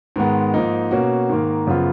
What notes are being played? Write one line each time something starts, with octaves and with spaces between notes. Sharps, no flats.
G#2 D#3 G#3 B3
G#2 F3 A#3 D#4
B2 A#3 C#4 F#4
G#2 D#3 A#3
F#2 C#3 F3 B3 F4